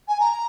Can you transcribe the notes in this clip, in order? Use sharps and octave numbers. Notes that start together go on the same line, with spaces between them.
G#5
A#5